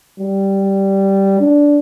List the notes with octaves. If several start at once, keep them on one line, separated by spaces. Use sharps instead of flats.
G3
D4